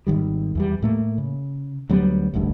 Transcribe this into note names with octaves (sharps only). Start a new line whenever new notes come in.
G#1 D#3 G3
E2 E3 G3
A2 A3 A#3
C#3
D2 F#3 G3 B3
E1 A1 D2 G2